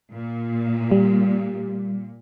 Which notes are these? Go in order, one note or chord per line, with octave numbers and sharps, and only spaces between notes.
A#2
G3